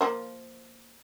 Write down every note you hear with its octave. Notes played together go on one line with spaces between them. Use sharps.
F3 A#3 C5